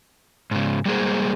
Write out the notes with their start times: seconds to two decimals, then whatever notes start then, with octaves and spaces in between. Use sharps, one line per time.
0.51 G#2 C#3
0.86 G3 G#3 A#3 G#4 C5